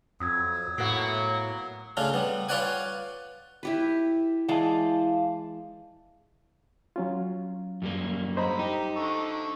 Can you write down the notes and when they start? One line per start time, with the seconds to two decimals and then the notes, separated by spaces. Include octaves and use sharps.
0.20 F2 F#3 D#6 E6 G#6
0.78 A2 A#3 B3 F#4
1.97 C#3 A3 C#4 D4 F4
2.14 G3 B3
2.49 F4 B4 C#5 D5 F#5 G#5
3.63 E4 G4 B4
4.49 E3 G#3 D5 F5 A5
6.96 F#3 C#4 F4
7.82 F#2 G3 A#3
8.37 D3 C5 D#5 A#5 B5
8.59 D#4 G4
8.97 D3 A4 C#6